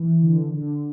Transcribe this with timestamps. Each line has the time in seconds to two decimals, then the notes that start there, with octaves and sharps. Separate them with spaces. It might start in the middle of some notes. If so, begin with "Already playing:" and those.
Already playing: E3
0.22 D3
0.54 D3